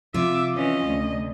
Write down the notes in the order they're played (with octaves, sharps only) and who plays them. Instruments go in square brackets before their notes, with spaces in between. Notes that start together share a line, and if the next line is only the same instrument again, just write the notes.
[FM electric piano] C3 F3 [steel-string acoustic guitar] F4 [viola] E5 D6
[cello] E3 C#4 [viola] D#5
[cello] D2